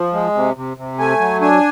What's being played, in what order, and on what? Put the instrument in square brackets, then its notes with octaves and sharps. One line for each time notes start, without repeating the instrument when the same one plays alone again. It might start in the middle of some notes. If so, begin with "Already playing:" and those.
Already playing: [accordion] F3
G#3
C3
C3
C3
A3 G#5
F#3
D4 G#5